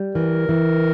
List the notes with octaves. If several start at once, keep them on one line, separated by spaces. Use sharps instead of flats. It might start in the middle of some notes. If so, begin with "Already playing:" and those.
Already playing: G3
E3 A#4
E3